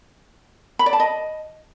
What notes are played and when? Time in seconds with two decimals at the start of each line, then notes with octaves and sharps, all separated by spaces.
0.79 B5
0.86 D5
0.93 A5
1.00 D#5